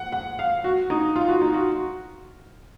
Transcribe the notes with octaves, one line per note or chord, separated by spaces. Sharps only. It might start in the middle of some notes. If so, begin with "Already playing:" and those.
Already playing: F#5
F#5
F5
F#4
D#4
F4
F#4
D#4
F#4